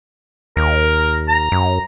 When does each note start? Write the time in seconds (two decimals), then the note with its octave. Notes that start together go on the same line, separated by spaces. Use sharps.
0.57 D#2 A#4
1.29 A#5
1.52 F#2